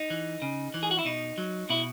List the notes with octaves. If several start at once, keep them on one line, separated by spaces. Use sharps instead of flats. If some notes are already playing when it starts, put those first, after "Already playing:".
Already playing: D#4
E3
C#3
E3
G#4
F#4
E4
B2 D#4
F#3
B2 E4